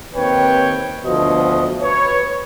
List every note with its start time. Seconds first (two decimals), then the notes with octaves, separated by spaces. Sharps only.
0.15 D#2 C4 B4 C#5 G5
1.05 D2 B2 F3 A3 D#5
1.81 B4 C#5